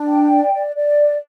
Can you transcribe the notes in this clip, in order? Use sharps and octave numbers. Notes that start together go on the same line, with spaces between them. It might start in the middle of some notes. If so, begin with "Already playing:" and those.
Already playing: D4
G5
D5
D5
D5